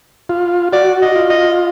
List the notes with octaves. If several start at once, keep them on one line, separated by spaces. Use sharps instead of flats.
F4
F#4 D5
D#5
F4
D#5